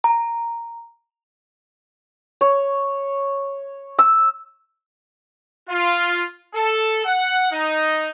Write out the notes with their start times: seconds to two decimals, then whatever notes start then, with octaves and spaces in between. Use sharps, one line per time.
0.04 A#5
2.41 C#5
3.99 E6
5.69 F4
6.54 A4
7.06 F#5
7.51 D#4